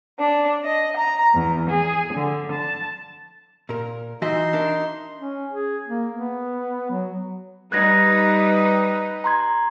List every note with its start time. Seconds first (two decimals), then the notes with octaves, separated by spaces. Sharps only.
0.18 D4
0.63 D#5
0.98 A#5
1.35 E2
1.71 G#4
2.14 D3
2.52 A5
3.69 A#2 A#4
4.22 E3 D#4 F#4 E5 C6
4.53 D4 A#4 E5
5.19 C#4
5.52 G#4
5.88 A#3
6.13 B3
6.91 F#3
7.72 G3 D#4 B4 F#6 G#6 A#6
9.24 A#5 C6 G#6